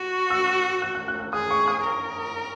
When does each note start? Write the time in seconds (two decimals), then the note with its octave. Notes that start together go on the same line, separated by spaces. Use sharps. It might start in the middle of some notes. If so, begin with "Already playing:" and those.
Already playing: F#4 C#6
0.30 E6
0.82 F#6
0.95 F#6
1.08 F#6
1.20 F#6
1.33 G#4 D#6
1.51 C#6
1.68 D#6
1.84 A#4